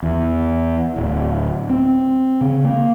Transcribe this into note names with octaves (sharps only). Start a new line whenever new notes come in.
E2
D1
C4
C#3
A#3